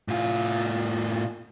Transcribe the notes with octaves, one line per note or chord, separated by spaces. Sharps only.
A2 F4